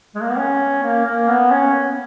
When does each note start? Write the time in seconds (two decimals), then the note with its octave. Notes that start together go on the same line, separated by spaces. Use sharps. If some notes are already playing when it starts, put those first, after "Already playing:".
0.15 G#3
0.22 A#3
0.30 B3
0.38 C#4
0.83 A#3
1.06 A#3
1.28 B3
1.51 C#4